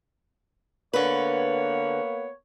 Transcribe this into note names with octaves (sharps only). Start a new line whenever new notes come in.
D3 A#3 B3 B4 C#5